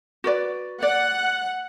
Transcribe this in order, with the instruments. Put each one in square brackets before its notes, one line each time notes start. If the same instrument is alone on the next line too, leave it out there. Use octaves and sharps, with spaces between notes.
[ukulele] F#4 B4 D5
[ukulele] D5 [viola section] F#5